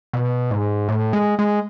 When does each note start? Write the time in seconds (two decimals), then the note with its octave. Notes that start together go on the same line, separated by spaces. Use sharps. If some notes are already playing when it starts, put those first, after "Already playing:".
0.13 B2
0.51 G#2
0.88 A2
1.13 G#3
1.39 G#3